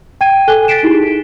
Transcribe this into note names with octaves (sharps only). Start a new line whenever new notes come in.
G5 G#6 D#7
A4 G#5 F#6 G7
A6 B6 C7 D7 E7
D#4 E4 G4 G#4
D#4